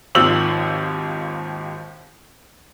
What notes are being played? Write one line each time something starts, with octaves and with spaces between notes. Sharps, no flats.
G#1 D#2 D#3 F3 E6 F#7